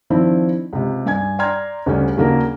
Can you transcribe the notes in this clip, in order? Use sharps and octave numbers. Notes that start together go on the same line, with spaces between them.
D#3 F3 C4 D4 E4
C#2 C3
G2 G#5 G#6
D5 G5 A#5 C6 F6 G#6
D2 C#3 G3 C#4
D#2 C#3 F#3 A#3 D4 A#4